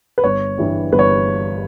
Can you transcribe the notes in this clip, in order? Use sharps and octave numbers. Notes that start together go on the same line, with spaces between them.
B4
G1 C#5
G2 E3 G3
G1 B4
C#5